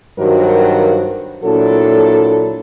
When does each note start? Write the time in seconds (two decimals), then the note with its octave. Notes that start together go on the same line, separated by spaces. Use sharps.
0.18 G2 D#3 F#3 F#4 A#4 C5
1.44 A#2 F#3 D4 E4 A4